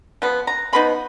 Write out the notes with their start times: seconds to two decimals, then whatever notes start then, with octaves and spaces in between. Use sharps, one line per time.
0.22 F3 B3
0.47 A#5
0.73 F3 B3 D#4 B5